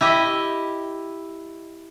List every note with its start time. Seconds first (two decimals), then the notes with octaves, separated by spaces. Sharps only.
0.01 E4 G4 D#5